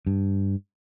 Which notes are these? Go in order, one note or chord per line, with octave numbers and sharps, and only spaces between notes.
G2